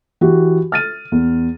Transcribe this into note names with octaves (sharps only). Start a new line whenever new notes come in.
E3 F#4 G4
F6 A6 D#7
E2